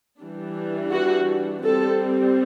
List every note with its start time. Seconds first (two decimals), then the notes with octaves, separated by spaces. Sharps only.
0.20 E3 G3 D4
0.92 F#4
1.63 G3 C4 A4